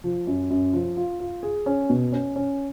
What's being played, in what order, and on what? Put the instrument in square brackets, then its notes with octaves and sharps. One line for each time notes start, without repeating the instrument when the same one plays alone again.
[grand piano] F3
F#2
F#2
F3
F4
F4
G#4
C#4
B2
C#4
C#4